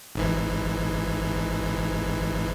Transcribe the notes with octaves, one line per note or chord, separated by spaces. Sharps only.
G#1 G#2 E3